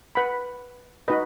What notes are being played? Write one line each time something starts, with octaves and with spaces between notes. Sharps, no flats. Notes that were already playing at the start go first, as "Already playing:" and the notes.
B4 F#5 B5
D#4 F#4 B4 D#5